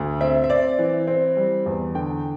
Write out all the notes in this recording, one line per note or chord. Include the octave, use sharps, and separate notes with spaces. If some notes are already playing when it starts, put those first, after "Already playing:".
Already playing: D2
C4 E5
E5
C4 D5
E3
C4
G3
E2
D3 G5